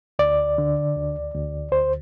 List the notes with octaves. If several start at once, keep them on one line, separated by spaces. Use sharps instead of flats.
D2 D5
D3
D2
D2
D2 C5